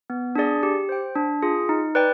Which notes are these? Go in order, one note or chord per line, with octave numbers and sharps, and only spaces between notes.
B3
D4 G#4 D5
G4
C5 G5
D4
F4 G#4
D#4
B4 D5 G5